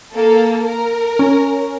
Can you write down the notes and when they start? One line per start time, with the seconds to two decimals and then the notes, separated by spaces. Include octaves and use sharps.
0.14 A#3 A4
0.65 A#4
1.19 C#4